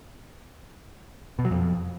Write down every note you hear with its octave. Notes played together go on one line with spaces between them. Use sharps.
B2
F#3
F2